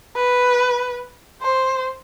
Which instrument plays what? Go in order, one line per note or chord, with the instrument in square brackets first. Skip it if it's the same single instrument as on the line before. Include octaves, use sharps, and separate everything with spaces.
[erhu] B4
C5